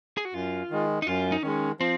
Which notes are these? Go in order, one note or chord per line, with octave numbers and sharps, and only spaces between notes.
G#4
F#4
F#2 F4
D#3 G#3
D#4
F#2 F4
D#4
D#3 G#3 C#4
F3 C4